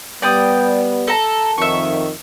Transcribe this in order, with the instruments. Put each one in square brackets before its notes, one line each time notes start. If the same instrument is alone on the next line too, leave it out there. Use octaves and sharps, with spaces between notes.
[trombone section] G3 B3 [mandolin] D5 G5 D#6
[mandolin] A4 A#5
[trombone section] F2 D#3 [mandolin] E5 C#6